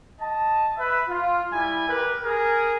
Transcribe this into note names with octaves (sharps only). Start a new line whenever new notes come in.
D#5 A5
B4 E5
F4
G3 E4 G#5
G4 A#4 B4
G#4 A#4